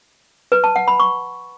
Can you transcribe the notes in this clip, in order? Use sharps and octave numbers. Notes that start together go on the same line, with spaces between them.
B4
A5
F#5
B5
C#6